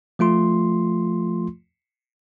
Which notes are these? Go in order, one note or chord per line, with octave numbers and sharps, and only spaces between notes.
F3 A3 F4 C6